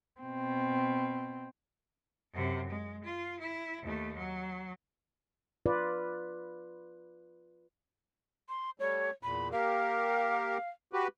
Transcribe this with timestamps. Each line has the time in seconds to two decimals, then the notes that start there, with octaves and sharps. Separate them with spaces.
0.21 B2 C4
2.33 F#2 C3
2.69 G#3
3.04 F4
3.40 E4
3.82 D#2 A3
4.17 F#3
5.66 F4 B4 D5
8.49 C6
8.80 G3 A3 C#5
9.23 E2 A#2 B5
9.52 A#3 G4 A#4 F5
10.93 F#4 G4 B4